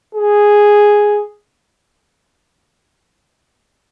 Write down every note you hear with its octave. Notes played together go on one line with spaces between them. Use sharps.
G#4